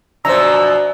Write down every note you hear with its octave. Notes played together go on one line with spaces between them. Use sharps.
F#2 B2 F3 D4 C5 A#5 E6